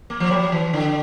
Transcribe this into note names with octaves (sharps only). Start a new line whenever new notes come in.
A#3
F3
F#3
E3
D3